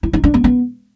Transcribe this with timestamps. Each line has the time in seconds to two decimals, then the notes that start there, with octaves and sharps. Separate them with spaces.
0.03 E4
0.13 D#4
0.24 D4
0.34 B3
0.44 B3